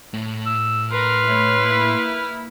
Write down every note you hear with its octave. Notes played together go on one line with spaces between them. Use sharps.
A2
E6
A#4 B4 C6 F6
A3 E4 C#5
A#3 E4